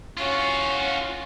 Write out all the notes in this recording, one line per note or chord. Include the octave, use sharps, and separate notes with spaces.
C#4 F4 F#4 F5